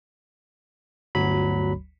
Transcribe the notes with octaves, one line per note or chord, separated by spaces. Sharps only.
G1 D2 F#3 B5